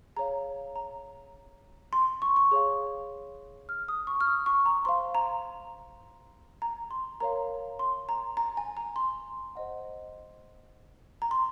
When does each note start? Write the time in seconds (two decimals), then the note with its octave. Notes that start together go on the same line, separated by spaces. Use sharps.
0.17 G#4 C#5 F5 A#5
0.76 A#5
1.93 C6
2.22 C#6
2.36 C#6
2.51 G#4 C#5 F5
3.69 F6
3.88 D#6
4.07 C#6
4.21 F6
4.27 D#6
4.46 C#6
4.66 A#5
4.85 C5 F5 C6
5.15 A#5
6.62 A#5
6.91 C6
7.20 A#4 C#5 F5 A#5
7.79 C6
8.09 A#5
8.37 A#5
8.57 G#5
8.77 A#5
8.96 C6
9.55 C5 D#5 F#5
11.22 A#5
11.31 C6